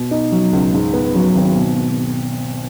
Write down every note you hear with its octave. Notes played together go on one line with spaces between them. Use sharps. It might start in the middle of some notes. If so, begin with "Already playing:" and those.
Already playing: B2
D#4
F#3
C#2
G#2
B3
F#3
G#1
B2